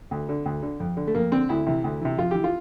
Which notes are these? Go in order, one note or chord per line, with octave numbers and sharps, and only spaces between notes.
D2
D3
D2
D3
F2
D3
A3
F2 A#3
D3 C4
D2 E4
C3 E3
D2
C3 E3
F2 F4
E3 G4
F4